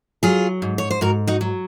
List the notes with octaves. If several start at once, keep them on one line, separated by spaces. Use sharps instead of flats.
F#3 F4 G#4
G#2
C#5
C5
G#2 F#4 A#4
D#4 F#4
F#3